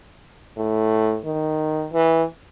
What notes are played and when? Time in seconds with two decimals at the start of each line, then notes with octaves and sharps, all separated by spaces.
0.57 A2
1.26 D#3
1.93 E3